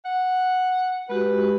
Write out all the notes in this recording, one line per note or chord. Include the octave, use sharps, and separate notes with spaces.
F#5
G#3 F#4 G4 B4